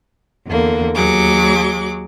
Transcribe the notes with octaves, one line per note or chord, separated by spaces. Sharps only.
E2 D3 A#3
D#2 F#3 G#4 D6